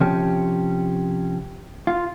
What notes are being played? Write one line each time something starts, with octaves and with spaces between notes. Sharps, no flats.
C3 F3 C#4 G4
F4